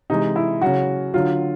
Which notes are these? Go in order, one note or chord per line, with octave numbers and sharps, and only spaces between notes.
C3 E3 G#3 D#4
E4
C#3 F#3 F#4
D3 F#3 F4